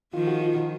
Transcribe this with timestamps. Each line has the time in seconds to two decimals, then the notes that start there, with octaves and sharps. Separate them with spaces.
0.14 D#3 F3 F4
0.27 F#4
0.41 F4
0.55 F#4